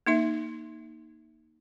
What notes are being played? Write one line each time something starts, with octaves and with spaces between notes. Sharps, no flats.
A#3 D#4 E5